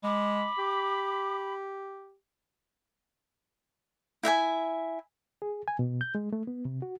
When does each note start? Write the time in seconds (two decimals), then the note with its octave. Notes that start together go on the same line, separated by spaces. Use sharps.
0.03 G#3 B5 D6
0.58 G4
4.23 E4 E5 G5 G#5
5.42 G#4
5.68 G#5
5.79 B2
6.01 G6
6.15 G#3
6.33 A3
6.47 B3
6.65 C3
6.82 F#4